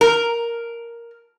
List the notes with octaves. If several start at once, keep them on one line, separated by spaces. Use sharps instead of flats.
A#4